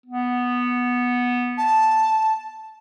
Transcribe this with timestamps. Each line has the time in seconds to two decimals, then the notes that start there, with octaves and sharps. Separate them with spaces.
0.06 B3
1.58 A5